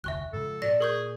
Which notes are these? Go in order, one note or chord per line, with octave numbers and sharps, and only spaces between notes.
F1 D2 E5 C#6 F#6
G#2 C#3 F3 A4
A#2 D5 A#6
G#4 A#4 C#6 G6